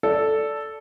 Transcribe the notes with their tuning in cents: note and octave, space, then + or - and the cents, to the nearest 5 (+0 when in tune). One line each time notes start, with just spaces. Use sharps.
A4 +0 D5 -10